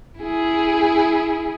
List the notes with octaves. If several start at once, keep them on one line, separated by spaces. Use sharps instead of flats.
E4 G#4